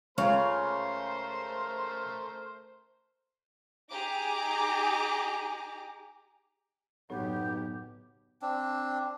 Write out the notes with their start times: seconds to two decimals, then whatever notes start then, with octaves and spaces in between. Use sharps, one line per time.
0.18 C#2 C#3 A3 A#4 C5 C#5 F5 C6
3.91 D#4 G4 G#4 A#5 D6
7.10 F#1 B1 A2 B3 G4 C#5
8.42 C4 D4